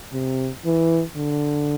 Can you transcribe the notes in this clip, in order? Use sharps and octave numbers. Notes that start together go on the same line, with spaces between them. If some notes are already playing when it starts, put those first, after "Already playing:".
C3
E3
D3